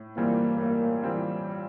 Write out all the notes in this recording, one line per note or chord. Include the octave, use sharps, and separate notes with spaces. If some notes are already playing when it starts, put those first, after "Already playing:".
Already playing: A2
E3 G3 A#3 C4 F4
A2 A#3
E3 G3 C4 F4